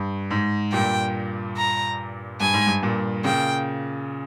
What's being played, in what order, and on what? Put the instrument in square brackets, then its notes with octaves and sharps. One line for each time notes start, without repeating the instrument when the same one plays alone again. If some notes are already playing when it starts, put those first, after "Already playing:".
Already playing: [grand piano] G2
G#2
[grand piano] G2 A#2 [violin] G5
[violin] A#5
[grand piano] G2 [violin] G#5
[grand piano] G#2
G2
G2 A#2
[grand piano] A#2 C#3 [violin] G5